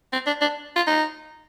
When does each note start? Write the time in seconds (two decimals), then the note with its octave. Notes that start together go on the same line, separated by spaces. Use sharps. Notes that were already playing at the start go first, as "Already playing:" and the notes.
0.13 C4
0.27 D4
0.41 D4
0.76 F4
0.87 D#4